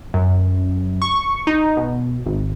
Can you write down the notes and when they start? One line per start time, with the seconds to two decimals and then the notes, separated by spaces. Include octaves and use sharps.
0.14 F#2
1.02 C#6
1.47 D#4
1.77 B2
2.26 G#1